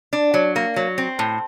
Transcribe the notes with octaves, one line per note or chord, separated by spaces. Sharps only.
D4
F#3
A#3
F#3
C4
A2